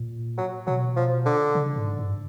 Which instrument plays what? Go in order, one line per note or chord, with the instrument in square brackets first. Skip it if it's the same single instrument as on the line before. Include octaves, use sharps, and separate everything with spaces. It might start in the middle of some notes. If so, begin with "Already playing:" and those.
Already playing: [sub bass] A#2
[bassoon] F#3
[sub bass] B2 [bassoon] F#3
[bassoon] F3
D3
[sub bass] C#3
G#2
G2